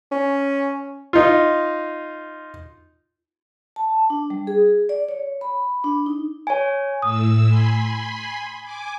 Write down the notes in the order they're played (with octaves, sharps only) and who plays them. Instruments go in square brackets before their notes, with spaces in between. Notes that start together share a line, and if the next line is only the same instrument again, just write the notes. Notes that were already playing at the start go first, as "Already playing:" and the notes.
[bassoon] C#4
[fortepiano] D#4 F4
[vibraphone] A5
D4
G3
G#4
D5
C#5
B5
D4
D#4
[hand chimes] C#5 G#5
[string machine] A2 E6 [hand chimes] D#6
[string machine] G#5 B5 C6
G#5 D6